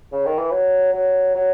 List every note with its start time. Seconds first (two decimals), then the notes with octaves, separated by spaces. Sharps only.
0.12 C#3
0.26 D#3
0.38 E3
0.51 F#3
0.93 F#3
1.35 F#3